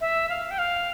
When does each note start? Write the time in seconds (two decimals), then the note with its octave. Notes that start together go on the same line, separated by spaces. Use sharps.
0.01 E5
0.29 F5
0.51 G5
0.58 F5